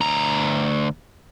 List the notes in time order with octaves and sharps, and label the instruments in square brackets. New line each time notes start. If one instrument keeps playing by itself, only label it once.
[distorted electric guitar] D2 A#5